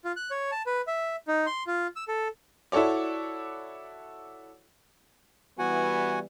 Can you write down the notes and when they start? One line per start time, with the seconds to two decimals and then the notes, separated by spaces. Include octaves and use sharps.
0.05 F4
0.16 F#6
0.31 C#5
0.52 A5
0.66 B4
0.87 E5
1.28 D#4
1.46 C6
1.67 F4
1.96 E6
2.08 A4
2.72 E4 F#4 A4 C#5 D5
5.58 E3 G3 B3 F#4 F#5 G#5